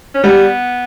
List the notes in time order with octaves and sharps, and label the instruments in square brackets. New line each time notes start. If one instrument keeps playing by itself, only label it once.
[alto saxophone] C#4
[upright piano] G3 [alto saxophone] B3